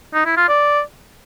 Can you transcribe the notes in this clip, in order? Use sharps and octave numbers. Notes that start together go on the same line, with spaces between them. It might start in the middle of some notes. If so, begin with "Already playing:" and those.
D#4
E4
F4
D5